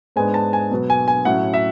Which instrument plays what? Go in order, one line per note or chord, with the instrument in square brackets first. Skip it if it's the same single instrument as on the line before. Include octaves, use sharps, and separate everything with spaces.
[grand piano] G#2 G#3 B3 D4 G#5
A5
G#5
B2 F#3 B3
G#5
G#5
A2 F#3 C#4 F#5
E5